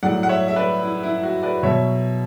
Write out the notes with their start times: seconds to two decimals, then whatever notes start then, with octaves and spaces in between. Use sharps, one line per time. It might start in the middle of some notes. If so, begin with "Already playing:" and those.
0.03 A2 F#3 D5 F#5
0.23 F#5
0.29 C#5 E5
0.48 E5
0.56 B4 D5
0.83 E4
1.03 E4
1.23 F#4
1.43 B4 D5
1.63 B2 F#3 C#5 E5